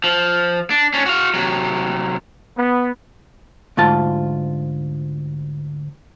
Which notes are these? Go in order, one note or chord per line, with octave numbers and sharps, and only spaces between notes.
F3
D4
C#4 D4
F#4 F5
C3 F#3
B3
D2 G#2 F4 A5